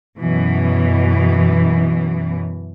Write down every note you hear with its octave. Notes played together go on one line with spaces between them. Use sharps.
F#2 B2 E3